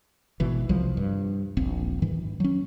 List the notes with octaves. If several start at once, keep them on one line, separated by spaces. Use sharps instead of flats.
G#1 B2 E3
C2 E3 F3 G3
G2
D#1 A#1 C4
G#2 D#3 E3
F#3 C#4